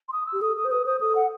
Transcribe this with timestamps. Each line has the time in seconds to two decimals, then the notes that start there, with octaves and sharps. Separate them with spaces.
0.08 C6
0.12 D#6
0.26 E6
0.33 G4
0.41 A4 D#6
0.56 A4 D#6
0.65 C5
0.71 B4 D#6
0.86 C5 D#6
1.00 A4 D#6
1.15 F#5